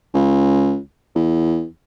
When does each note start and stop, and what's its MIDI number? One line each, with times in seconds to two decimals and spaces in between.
0.14 0.77 37
1.15 1.65 40